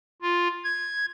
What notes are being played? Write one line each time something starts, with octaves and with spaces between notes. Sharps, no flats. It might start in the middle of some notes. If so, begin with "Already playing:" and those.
F4
G#6